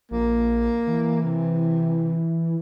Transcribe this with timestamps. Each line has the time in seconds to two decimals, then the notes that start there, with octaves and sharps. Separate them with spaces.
0.11 A#1 A#3
0.87 E3
1.22 C3